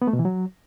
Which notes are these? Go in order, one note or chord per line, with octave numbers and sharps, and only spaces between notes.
B3
A3
B2
E3
F#3